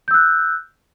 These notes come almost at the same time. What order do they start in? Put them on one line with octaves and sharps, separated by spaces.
G6 E6 F#6